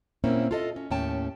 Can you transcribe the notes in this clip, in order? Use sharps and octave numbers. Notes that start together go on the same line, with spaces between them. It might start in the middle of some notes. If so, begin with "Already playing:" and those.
A#2 A#3 C4 C#4 E4
F4 A4 D#5
C#4
D#2 A2 C#4 G5 A5